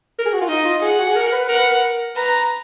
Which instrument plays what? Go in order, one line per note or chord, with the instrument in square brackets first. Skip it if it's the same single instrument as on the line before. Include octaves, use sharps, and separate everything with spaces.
[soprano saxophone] A#4
G#4
F#4
F4
[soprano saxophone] D#4 [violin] D#5
[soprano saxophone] F4
[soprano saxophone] G#4 [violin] F#5
[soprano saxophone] F#4
G#4
A#4
B4
[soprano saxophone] A#4 [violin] F#5
[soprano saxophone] B4
A#4
[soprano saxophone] B4 [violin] A#5